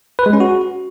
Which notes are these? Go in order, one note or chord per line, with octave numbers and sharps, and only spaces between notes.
B4
G#3
C#4
F#4